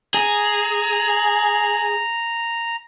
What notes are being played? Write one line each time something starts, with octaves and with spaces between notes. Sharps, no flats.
G#4 A#5